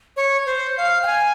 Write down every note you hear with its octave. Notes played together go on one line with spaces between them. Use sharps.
C#5
C5
F5
G5
G#5